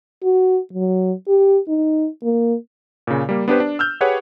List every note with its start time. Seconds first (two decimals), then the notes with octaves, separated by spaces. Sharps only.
0.24 F#4
0.73 F#3
1.28 G4
1.68 D#4
2.24 A#3
3.07 A#2 C#3
3.29 G3 A#3
3.48 B3 D4 G4 B4 C5
3.60 D4
3.79 E6 F6 G6
4.01 G4 G#4 B4 C#5 F#5